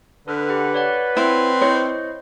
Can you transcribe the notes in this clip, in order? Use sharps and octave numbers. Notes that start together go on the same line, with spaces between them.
D3 A4 B4 F6
G4 F#5
C#5 D5 F#5
C4 E4
E4 C5 C#5 D#5